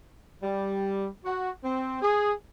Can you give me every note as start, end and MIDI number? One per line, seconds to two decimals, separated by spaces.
0.42 1.07 55
1.25 1.50 66
1.64 2.00 60
2.02 2.32 68